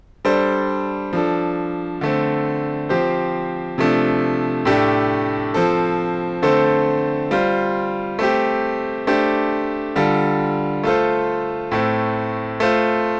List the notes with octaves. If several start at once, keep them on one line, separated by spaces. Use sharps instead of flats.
G3 D4 A4 C5
F3 D4 A4
D3 A3 C4
F3 C4 G4 C5
C3 F3 A3 D4
A2 A3 D4 G4
F3 C4 A4
D3 A3 C4 A4 C5
G3 F4 C5
A3 C4 G4
A3 D4 G4 C5
D3 G3 F4 A4
A3 F4 A4 C5
A2 A3 C4
A3 F4 C5